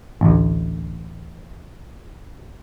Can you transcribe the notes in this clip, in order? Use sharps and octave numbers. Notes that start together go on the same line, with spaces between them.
A1 D2